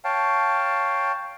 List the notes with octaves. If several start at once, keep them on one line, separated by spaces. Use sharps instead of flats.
C#5 F5 G5 A5